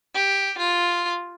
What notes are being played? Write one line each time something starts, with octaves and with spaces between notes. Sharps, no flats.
G4
F4